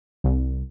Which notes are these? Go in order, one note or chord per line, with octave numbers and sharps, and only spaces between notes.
C2